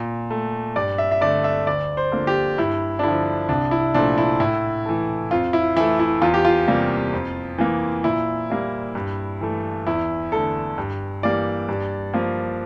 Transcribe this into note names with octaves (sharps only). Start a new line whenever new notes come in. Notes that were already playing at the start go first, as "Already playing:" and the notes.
Already playing: A#2
A3
G2 D5
E5
E5
D3 A3 D5
E5
D2 D5
C5
D3 F3 A#3
G4
G2 E4
D4
D3 F3 E4
C2 D4
E4
A#2 F3 A3 D4
E4
A2 E4
E3 A3
F2 F4
E4
E3 A3 E4
E4
E2 F4
G4
F4
C3 G3 A#3
F2
E3 A#3
A#2 E4
G3 A#3
G2
E3 A3
E2 E4
D3 A3 A4
G2
E3 G3 A#3 D5
G2
F3 A#3